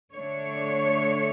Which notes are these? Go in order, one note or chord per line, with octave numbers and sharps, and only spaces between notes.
D3 A3 D4 C#5